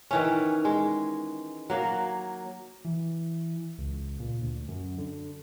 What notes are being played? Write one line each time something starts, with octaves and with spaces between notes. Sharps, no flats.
D#3 E3 C#4
G#3
F#3 A#3
E3
C#2
A#2
D2
F#2
D3